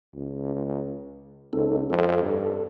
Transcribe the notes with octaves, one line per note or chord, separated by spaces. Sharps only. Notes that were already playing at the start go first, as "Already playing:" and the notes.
C#2
C#2 C4 D#4 A4
F2 A4
G2